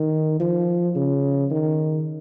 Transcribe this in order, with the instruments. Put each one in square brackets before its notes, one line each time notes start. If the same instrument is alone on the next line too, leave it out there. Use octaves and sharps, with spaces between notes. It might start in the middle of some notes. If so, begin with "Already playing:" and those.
Already playing: [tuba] D#3
F3
C#3
D#3